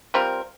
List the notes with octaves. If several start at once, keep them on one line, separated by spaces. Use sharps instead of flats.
G3 C4 F4 A#4